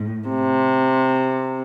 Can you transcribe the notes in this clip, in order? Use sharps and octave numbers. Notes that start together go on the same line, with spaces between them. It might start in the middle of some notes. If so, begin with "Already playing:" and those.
Already playing: A2
C3